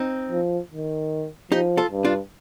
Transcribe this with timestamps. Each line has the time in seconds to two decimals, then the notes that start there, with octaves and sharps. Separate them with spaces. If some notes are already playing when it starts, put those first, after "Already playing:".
Already playing: C4 D#4
0.31 F3
0.71 D#3
1.52 F3 D#4 G4
1.77 F4 A4
1.91 G2
2.05 D4 F4